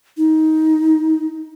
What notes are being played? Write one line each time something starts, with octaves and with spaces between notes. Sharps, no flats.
D#4